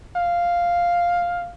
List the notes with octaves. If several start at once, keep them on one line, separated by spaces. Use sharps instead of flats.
F5